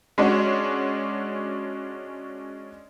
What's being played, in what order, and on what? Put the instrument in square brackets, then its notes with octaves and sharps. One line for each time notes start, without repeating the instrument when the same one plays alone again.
[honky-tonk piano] G#3 C#4 D4 F#4